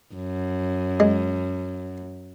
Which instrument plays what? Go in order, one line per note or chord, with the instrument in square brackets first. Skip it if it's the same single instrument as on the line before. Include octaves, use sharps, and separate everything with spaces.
[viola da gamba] F#2
[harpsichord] G#3